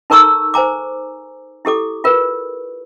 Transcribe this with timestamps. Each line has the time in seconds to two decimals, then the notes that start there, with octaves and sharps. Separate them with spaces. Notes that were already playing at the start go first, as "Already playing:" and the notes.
0.10 D#4 A4 A#4 A#5 C#6 E6
0.54 C5 G#5 A#5 D6
1.65 E4 G4 A4 D6
2.04 F4 A#4 B4